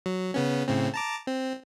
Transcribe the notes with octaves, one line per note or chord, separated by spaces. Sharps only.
F#3
C#3 B3 C#4
A2 C#3 C4
A5 A#5 D6
C4